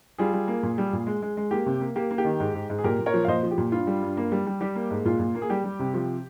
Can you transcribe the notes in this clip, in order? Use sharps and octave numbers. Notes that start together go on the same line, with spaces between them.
G3 F4 G#4
G3
A#3
A#2
G3
A#2
G#3
G#3
G#3
A#3 G4
C3
A#3
A#3 G4
A#3
G4
D#3
G#2
G#2
G#2
G#4
A#2 G4 A#4
A#2
A#4 C#5
F3
F5
A#2 C5 D#5
F3
G4
A#2
G2 F4
G3
G2
A#3
G3
G3
G3 G4
A#3
G#2
A#2 F4
A#2
A#3
G#4
G3 G4
G3
C3
F3